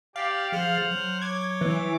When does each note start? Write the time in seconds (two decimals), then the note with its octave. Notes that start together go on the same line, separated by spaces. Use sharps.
0.16 G4 D5 F5
0.52 F3 G#4 C5 F#5 F6 A6
0.91 F#3
1.22 C#5 D6 G#6
1.61 E3